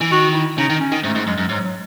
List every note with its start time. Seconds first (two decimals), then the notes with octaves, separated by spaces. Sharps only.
0.01 E3
0.11 D#3 F#4
0.34 E4
0.58 C#3 D#4
0.69 D#3
0.80 C#4
0.92 D#3
1.03 G#2 A3
1.15 G#2
1.27 F#2 G#3
1.38 F#2
1.49 G#2 F#3
1.65 F#3